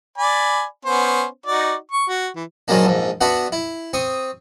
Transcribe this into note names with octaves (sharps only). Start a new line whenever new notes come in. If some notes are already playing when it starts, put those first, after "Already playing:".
D5 G#5 B5
B3 C#4 C5
D#4 F#4 D5
C#6
F#4
E3
G#2 D#3 F#3 G#3 A#3 D4
A#1 G#2
B3 D4 F#4 E5 F#5
E4
C4 C#6 D#6